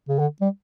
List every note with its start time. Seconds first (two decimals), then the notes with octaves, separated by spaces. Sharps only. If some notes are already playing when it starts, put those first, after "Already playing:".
0.09 C#3
0.19 D3
0.41 G3